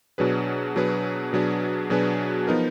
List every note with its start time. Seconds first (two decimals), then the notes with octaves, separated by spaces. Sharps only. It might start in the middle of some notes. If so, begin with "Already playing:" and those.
0.18 B2 F#3 D4 G#4 B4
0.76 B2 F#3 D4 G#4 B4
1.33 B2 F#3 D4 G#4 B4
1.90 B2 F#3 D4 G#4 B4
2.47 F3 B3 D#4 A#4